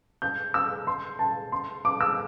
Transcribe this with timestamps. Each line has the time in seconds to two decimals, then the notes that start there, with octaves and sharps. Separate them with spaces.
0.22 G6
0.54 E6
0.87 C6
1.19 A5
1.52 C6
1.85 D6
2.01 E6